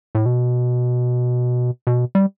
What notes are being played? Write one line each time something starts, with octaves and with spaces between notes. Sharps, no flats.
A2
B2
B2
G3